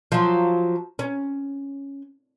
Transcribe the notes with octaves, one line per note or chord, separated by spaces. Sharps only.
F3 F#3
C#4